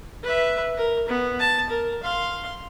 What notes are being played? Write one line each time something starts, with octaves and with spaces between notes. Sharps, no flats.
B4 E5
A#4
B3
A5
A#4
F5 C6